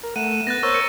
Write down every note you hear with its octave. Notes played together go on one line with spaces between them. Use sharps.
A#4
A3 F#5 D#7 E7
B3 F#6 A6 A#6
A#4 C5 C#5 C#6 E6 A6
C#7